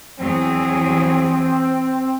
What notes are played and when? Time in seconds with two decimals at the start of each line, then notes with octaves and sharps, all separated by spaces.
0.19 E2 F#3 C4 G#4